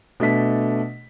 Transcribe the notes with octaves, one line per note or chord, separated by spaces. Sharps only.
B2 A3 D4 B6